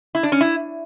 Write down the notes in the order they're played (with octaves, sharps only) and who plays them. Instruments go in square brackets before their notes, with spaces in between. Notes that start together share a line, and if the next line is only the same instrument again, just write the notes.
[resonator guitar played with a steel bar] E4
D4
C#4
E4